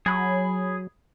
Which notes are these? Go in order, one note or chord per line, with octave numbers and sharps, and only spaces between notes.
F#3 G#4 B5